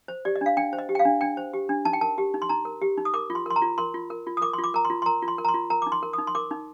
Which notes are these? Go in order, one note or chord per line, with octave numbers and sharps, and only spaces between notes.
C5
G4 D5
D#5
D4 F5
D4 G5
C5
D#5
G4
G5
F5
D4
D4 G5
C5
G4
D4
D#4 A5
G5
A#4 A5
G4
D#4
C6
D#4 A#5
A#4
G4
D#4
D#6
A#4 D6
F4
C6
A#4 C6
A#5
F4
A#4 C6
F4
A#4
F4
D#6
A#4 D6
C6
F4
D6
A#4 A#5
C6
F4
C6
A#4 A#5
F4
C6
A#4
A#5
C6
F4
A#4 A#5
D#4 D6
C6
A#4
D#6
D#4
C6
A#4 D6
D#4